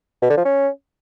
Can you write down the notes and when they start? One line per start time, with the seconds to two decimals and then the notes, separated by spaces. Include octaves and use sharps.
0.22 B2
0.30 D3
0.37 F3
0.45 C#4